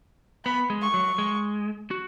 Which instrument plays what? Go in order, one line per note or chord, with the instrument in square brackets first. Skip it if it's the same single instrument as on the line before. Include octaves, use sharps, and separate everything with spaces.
[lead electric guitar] B3 [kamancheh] B5
[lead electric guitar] G#3
[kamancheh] C#6
[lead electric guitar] F#3
G#3
F#4